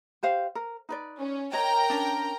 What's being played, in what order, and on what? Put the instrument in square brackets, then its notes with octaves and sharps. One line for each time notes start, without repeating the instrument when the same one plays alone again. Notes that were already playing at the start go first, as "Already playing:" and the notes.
[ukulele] G4 C5 F5
A#4
D#4 B4 D5
[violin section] C#4
[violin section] A#4 G5 A#5 [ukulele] C#5 D#5
[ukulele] C#4 D4